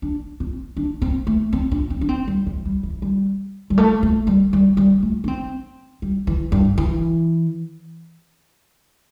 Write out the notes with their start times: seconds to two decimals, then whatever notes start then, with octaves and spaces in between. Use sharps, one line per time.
0.02 D4
0.40 C4
0.77 D4
1.02 C4
1.27 A3
1.53 C4
1.72 D4
1.90 C4
2.01 D4
2.09 C4
2.28 G3
2.46 E3
2.65 G3
2.83 E3
3.02 G3
3.70 G3
3.78 A3
4.03 A3
4.27 G3
4.53 G3
4.77 G3
5.03 A3
5.24 D4
5.28 C4
6.02 G3
6.27 E3
6.52 G2
6.78 E3